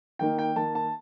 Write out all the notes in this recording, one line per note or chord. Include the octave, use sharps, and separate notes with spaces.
D#3 A#3 D#4 G5
G5
D#3 A#3 D#4 A5
A5